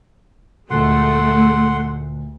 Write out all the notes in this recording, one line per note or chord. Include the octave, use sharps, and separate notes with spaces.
D2 A#2 G#3 A3 F#5 C6